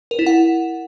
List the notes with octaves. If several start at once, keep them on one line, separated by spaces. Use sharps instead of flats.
A#4
E4
F#5